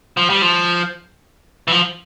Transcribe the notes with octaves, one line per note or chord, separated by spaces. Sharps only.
F3
G3
F3
E3
F3